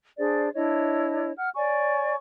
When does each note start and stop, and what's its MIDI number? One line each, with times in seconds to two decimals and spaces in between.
0.18 0.49 62
0.18 0.49 68
0.18 0.49 72
0.18 0.49 74
0.54 1.32 62
0.54 1.32 64
0.54 1.32 73
0.54 1.32 75
1.37 1.49 78
1.37 1.49 89
1.56 2.15 73
1.56 2.15 74
1.56 2.15 80
1.56 2.15 85